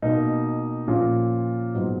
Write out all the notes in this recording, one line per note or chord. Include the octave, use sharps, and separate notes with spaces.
B2 A#3 D#4
A#2 F3 A#3 C#4
G#2 F#3 B3 D#4